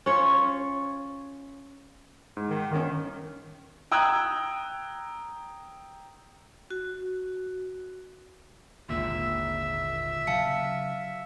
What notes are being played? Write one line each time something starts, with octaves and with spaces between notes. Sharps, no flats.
C#4 F4 C#5
G#2
D#3
G1 D#3 C#4
G5 A#5 D#6 E6 F#6 G#6
F#4
G#1 D#2 A#2 D3 A#3 E5
C#3 F#3 F5 A5 C#7